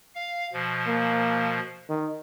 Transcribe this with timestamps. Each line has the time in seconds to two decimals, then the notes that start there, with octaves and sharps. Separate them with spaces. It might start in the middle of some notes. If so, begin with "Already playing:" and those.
0.15 F5
0.53 B2 F3
0.87 A#3
1.89 D#3